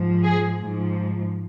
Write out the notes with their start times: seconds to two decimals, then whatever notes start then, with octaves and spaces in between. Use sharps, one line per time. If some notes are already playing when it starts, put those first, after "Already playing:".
Already playing: G#2 F3
0.22 G#4
0.61 G#2 F3